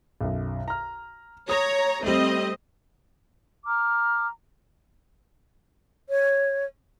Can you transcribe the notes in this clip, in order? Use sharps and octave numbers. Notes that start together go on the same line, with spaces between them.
B1 F#2
A#5 F6
C#5 A#5 D#6
G3 A3 C4 D#5
A#5 D6 F6
C#5